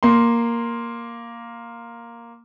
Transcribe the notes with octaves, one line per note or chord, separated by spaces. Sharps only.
A#3 C6